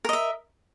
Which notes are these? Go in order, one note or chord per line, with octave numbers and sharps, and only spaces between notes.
A#4 D#5 E5